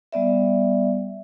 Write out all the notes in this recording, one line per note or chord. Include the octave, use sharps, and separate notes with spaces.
G3 B3 D5 E5